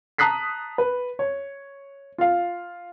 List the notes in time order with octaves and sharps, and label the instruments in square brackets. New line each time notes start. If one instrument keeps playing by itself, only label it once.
[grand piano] A5 A#5 D#6 F#6 B6 C7
B4
C#5
F4 F5